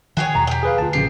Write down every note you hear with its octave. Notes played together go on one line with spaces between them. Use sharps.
D#3 F3 F#4 G#4 C#5 G5 G#5
E2 B2 A#5
G4 G5 G6
G#4 B4 F5
D2 F4 A5
A#1 C#3 G4 C7